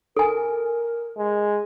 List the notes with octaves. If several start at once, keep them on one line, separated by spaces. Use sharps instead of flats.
A4 A#4 G#5
G#3